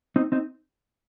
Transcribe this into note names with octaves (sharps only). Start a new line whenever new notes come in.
C4 D#4
C4 D#4